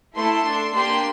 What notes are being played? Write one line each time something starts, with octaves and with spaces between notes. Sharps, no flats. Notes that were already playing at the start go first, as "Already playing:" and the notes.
A3 E4 A4 C6
D4 A4
A#3 D4 G4 C6